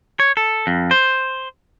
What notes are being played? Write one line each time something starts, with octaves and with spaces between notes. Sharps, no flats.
C#5
A4
F2
C5